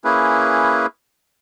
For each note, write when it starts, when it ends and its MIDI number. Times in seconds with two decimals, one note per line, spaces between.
0.04 0.86 58
0.04 0.86 61
0.04 0.86 64
0.04 0.86 68
0.04 0.86 71